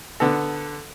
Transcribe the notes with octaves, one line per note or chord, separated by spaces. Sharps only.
D3 B3 A4